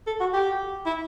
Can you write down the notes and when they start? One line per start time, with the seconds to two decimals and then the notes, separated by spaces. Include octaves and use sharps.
0.07 A4
0.20 F#4
0.34 G4
0.86 E4